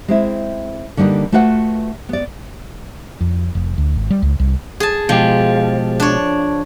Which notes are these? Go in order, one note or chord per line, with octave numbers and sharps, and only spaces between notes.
G#3 C4 E4
D3 G3 A#3 D#4 B4
A3 F4 F#4 B4 C#5 F#5
B3 D5
F2
F1
D2
G#1
G3
C#2
C2
G#4 A5
B2 F3 G#3 G4
D4 C#5